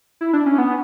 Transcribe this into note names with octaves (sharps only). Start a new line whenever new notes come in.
E4
D4
C#4
B3